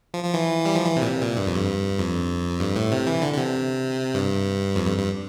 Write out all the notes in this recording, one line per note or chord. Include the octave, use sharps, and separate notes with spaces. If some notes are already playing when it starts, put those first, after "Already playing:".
F3
F3
E3
G3
F3
E3
C3
A#2
C3
A#2
G2
F2
G2
F2
G2
A2
C3
E3
D3
D3
C3
G2
F2
G2
G2